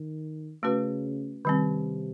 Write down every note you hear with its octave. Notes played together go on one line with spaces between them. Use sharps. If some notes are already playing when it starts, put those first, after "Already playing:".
Already playing: D#3
C#3 A3 C#4 F#4 B4
C3 D#3 G3 C4